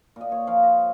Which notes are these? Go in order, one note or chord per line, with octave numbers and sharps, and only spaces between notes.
A#2 D#5
C#5
F3 F5
D#5